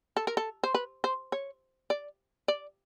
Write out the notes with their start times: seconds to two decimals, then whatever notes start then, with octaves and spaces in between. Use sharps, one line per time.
0.17 A4
0.27 A#4
0.37 A4
0.64 C5
0.75 B4
1.04 C5
1.32 C#5
1.90 D5
2.48 D5